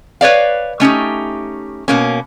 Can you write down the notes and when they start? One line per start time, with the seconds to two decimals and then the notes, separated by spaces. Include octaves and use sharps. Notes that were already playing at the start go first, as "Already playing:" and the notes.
0.21 B4 C#5 D5 F5
0.80 A3 C#4 D#4 G4
1.88 B2 A#3 C#4